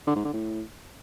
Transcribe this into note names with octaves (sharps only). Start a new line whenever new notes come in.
D3
G#2
D3
A2